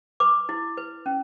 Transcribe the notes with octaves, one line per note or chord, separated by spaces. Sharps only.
B4 D6
E4
B4
C#4